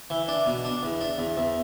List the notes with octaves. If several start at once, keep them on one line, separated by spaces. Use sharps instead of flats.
E3
D4
B2
D4
E2
D4
E2
E2